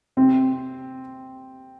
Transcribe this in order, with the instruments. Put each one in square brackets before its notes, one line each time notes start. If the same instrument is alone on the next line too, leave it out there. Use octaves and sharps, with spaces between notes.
[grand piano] C3 C4